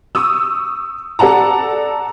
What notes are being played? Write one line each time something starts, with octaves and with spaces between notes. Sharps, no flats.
C#6 D#6 E6
A4 D5 F#5 A5 A#5